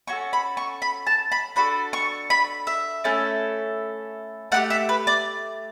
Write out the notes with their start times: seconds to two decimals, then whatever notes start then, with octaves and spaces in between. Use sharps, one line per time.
0.07 C#4 F#4 A4 C#6
0.33 B5
0.57 C#6
0.82 B5
1.07 A5
1.32 B5
1.56 D4 F#4 A4 B5
1.93 C#6
2.30 B5
2.67 E5
3.04 A3 C#4 E4 A4
4.52 A3 E4 G4 F#5
4.70 E5
4.89 B4
5.07 D5